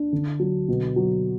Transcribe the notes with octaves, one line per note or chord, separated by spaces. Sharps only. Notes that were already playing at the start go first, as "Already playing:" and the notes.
Already playing: D4
D3
F#3
B2
F#3